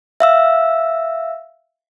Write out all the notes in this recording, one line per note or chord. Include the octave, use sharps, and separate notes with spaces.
E5 F5 E6